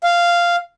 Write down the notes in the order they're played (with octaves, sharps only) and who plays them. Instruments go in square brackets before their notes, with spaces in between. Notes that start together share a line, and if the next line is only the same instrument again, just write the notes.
[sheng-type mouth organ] F5